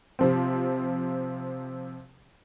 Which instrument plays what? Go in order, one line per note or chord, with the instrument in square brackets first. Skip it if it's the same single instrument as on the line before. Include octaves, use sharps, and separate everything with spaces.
[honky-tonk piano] C3 F3 C4